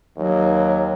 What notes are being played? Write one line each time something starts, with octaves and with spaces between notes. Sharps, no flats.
D#2 F#3